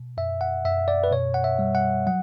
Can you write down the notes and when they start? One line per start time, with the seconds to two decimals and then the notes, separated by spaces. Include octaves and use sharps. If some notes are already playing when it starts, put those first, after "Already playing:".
Already playing: B2
0.17 F#2 E5
0.41 F#5
0.65 F#2 E5
0.88 D5
1.04 B4
1.11 B2 C#5
1.34 F#5
1.44 E5
1.59 G3
1.75 F#5
2.07 F#3 F#5